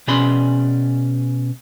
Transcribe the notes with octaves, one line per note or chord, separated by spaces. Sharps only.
B2 C#4 G#4 D5 B5 C6